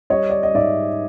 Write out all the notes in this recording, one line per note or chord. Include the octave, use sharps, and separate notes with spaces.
G3 C#5 D#5
D5
D#5
G#2 D5 E5